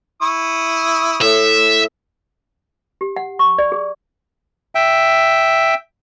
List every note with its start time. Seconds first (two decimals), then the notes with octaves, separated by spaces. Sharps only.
0.22 E4 C#6 D#6
1.21 A2 E5
3.01 G4
3.16 F#5
3.39 C#6
3.58 D5
3.72 G#4
4.75 E5 G5